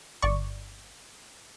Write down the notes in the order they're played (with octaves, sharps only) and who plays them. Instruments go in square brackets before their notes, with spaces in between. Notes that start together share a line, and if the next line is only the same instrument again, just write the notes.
[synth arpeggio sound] G1 D5 C#6